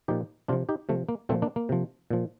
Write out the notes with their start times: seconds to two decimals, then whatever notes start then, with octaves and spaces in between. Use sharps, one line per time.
0.08 A#2 F3 D#4 G4
0.48 C3 D4 F4
0.52 F3
0.69 D#4 G4
0.89 C3 F3 A3
1.09 A#3
1.29 A#2 F3 A3 C4
1.42 A#3 D4
1.56 A#3
1.69 C3 F3
2.11 A#2 F3